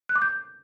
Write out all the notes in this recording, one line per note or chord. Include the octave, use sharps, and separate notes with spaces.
F#6
D6
G6